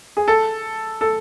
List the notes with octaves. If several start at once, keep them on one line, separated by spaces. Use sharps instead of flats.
G#4
A4
A4